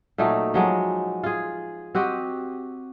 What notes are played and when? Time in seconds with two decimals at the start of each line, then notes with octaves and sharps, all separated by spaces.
0.18 A#2 F#3 A3 D#4
0.54 F3 F#3 G#3
1.23 F4 G#4
1.95 C4 F#4 G4 D#5